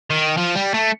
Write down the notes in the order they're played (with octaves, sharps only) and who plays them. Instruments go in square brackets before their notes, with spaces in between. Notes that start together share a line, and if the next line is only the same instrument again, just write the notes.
[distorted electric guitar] D#3
F3
G3
A3